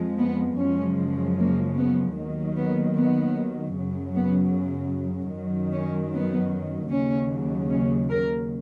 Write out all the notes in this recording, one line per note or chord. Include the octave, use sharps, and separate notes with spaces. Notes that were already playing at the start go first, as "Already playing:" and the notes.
Already playing: F2 F3 G#3
B3
F#2 C#3 F3 G#3 C#4
A#3
B3
D#2 D#3 F#3
B3
B3
F#2 C#3 F#3
B3
F#2 D#3 F#3
C#4
B3
D#2 C#3 F#3 C#4
C#4
A#4